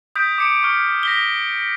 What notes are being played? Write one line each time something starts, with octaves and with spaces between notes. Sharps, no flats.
D#6 G6 B6 D7
D6 C#7 D7
C#6 F6
A#6 B6 G7